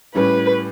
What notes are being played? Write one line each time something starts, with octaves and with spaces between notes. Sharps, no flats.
A2 G3 C#4 E4 B4